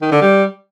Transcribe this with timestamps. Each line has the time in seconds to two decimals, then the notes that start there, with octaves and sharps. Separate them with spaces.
0.02 D#3
0.12 D3
0.21 G3